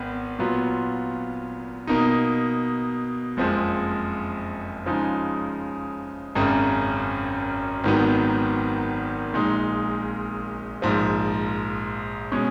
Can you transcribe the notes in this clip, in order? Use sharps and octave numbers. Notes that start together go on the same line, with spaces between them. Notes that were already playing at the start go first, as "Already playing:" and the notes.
Already playing: G#1 B3
A#2 F#3 B3 F4
B2 A#3 D#4
F#1 F2 F3 G#3
C#3 F3 G#3 D#4
G#1 F#2 C#3
G#1 G#2 D#3 F#3 B3
A#1 A#2 G#3 D#4 G#4
A#1 G#2 F3
B2 G#3 C#4